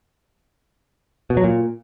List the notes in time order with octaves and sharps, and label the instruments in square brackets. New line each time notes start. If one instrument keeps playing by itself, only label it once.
[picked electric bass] B2
F#3
A#2